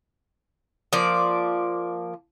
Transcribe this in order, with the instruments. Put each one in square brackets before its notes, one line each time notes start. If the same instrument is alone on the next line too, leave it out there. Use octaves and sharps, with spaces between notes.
[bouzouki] F3 A#3 D5